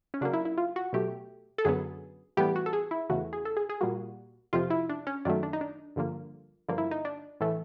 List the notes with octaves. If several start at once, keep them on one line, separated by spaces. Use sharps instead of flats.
C#4
C#3 F#3 A#3 D4
E4
E4
F4
F#4
B2 F#3 A3 G4
A4
F#2 D3 F#3 B3 G#4
A2 E3 G3 B3 G4
F#4
A4
G#4
E4
E2 C#3 E3 A3 F#4
G#4
A4
G#4
G#4
A#2 G3 A#3 F#4
F2 C3 F3 F4
E4
D4
C#4
F#2 D#3 F#3 A3 D4
D4
D#4
D4
G2 D3 F3 A#3
G2 D3 F3 A#3
E4
D#4
D4
A2 E3 A3